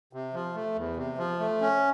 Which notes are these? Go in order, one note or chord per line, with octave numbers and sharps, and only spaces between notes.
C3
F3
A3
E2
C3
F3
A3
C#4